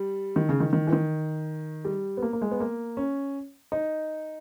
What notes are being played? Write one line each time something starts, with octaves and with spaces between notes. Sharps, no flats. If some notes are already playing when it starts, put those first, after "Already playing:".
Already playing: G3
D#3
C#3
D#3
D#3
E3
D#3
G3
B3
A#3
A#3
G#3
B3
A#3
C#4
D#4